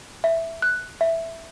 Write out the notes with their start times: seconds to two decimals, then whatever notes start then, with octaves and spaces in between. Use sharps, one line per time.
0.24 E5
0.62 F#6
1.01 E5